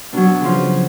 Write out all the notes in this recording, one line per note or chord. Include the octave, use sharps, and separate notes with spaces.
B2 F#3 D4
C#3 F3 F4